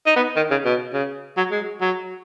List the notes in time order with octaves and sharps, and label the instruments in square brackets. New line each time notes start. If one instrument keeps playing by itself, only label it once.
[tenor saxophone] D#4
B3
D#3
C#3
B2
C#3
F#3
G#3
F#3